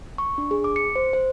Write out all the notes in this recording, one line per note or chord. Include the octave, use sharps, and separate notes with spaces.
C#6
D4
G#4
D6
C#7
C5
C5